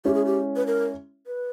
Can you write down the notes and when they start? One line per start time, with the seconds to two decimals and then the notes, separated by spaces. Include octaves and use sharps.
0.05 G#3 C#4 E4 G4
0.15 G#4
0.25 G4
0.56 B4
0.67 A#4
1.27 B4